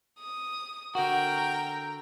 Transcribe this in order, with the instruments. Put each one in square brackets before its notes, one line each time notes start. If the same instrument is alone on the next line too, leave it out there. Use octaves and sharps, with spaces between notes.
[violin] D#6
[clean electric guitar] D3 F#4 [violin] A#4 G5